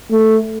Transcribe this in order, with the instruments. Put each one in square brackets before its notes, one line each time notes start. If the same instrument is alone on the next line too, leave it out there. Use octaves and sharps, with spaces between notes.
[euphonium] A3